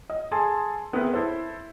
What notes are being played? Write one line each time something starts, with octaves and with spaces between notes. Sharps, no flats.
D#5
G#4 A4 G#5 A5 C6
B3 C4 G#4 A#4 B4 E5
E4 A4 C5